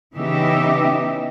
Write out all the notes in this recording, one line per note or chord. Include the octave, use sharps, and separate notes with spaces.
C#3 E3 B3 D#4 G4 E5